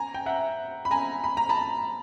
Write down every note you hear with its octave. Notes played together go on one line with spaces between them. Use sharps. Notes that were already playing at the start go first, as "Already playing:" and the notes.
Already playing: G#5 A#5
G5
E5 F#5
B5
G#5 A#5
B5
A#5
A5 B5